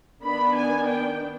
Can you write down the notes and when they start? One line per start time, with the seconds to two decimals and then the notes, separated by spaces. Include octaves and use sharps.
0.24 D#3 B3 D4 B5
0.56 G#5
0.88 G5